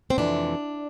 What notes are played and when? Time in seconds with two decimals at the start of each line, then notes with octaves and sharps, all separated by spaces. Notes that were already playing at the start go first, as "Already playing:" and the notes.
0.10 C4
0.18 F2 C3 E3 A3 D4